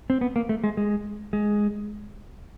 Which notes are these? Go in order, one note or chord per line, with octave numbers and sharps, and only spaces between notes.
C4
B3
A#3
A3
G#3
G#3
G#3